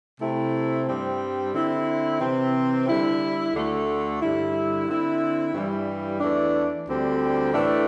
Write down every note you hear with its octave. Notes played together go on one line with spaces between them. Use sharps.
C3 A3 C4 E4
G2 G3 C4
D3 C4 E4
C3 E3 C4
D3 G3 E4
D2 D3 A3
G2 D3 G3 E4
D3 C4 E4
G2 E3 G3
E2 E3 A3 D4
D2 D3 G3 C4
A2 E3 A3 D4